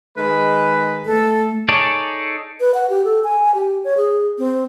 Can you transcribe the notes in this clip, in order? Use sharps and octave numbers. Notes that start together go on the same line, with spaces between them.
D#3 G#3 B4
A3 A4
D#4 G#4 A4 C#5 D5
B4
F#5
G4
A4
G#5
G4
C#5
G#4
C4